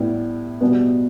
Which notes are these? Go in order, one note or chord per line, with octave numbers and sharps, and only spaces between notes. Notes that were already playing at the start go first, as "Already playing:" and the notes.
Already playing: A2 G3 B3 E4 G4
B2 G3 B3